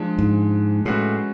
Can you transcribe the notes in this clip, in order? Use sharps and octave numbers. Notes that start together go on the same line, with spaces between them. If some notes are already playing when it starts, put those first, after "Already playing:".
Already playing: F3 G#3 D4
G#2
A2 G#3 C#4 F#4 B4